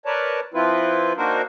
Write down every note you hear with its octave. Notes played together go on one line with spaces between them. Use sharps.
A#4 B4 C#5 D5 A5
F3 C4 E4 F4 B4
A#3 D4 D#4 F#4 A#4 C5